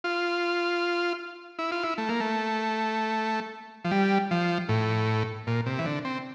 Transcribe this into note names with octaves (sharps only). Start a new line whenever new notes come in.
F4
E4
F4
E4
A3
A#3
A3
F3
G3
F3
A2
A#2
C3
E3
D3
C4